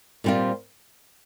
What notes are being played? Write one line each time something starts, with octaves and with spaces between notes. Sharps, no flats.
A#2 G3 C4 F4